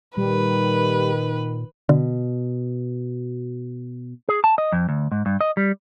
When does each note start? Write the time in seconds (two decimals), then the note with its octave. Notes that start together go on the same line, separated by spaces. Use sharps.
0.17 A#2 D#3 G3 B4
1.89 B2 D3
4.29 G#4
4.44 A5
4.58 D#5
4.72 F2
4.89 D2
5.12 G#2
5.26 G2
5.41 D#5
5.57 G3